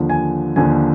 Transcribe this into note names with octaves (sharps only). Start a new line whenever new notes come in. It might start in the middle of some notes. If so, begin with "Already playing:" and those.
Already playing: D#2 D3 F3
G#5
D#2 D3 F3 G#5